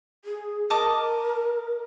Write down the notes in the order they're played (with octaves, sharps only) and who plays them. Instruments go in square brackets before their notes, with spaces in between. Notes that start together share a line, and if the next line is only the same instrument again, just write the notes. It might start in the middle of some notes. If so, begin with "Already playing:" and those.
[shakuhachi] G#4
[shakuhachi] A#4 [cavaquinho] D#5 A5 D6